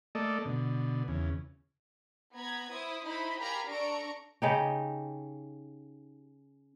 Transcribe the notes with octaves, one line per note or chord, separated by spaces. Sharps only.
A3 A#3 A4 D5 D#5
B2 D3
E2 C#3
B3 A#5 B5 G#6
E4 C5 D#6
D#4 E4 C5 D#5 B5
G4 A#4 F5 G#5 A#5 B5
D4 A4 A#5 C#6 D7
C#3 D#4 G4